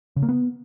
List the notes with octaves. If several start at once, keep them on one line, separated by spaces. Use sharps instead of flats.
C#3
A#3
B3